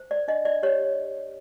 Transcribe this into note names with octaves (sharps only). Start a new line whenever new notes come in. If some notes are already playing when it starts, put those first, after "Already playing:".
Already playing: C5
D5
D4 D#5
D5
G4 C#5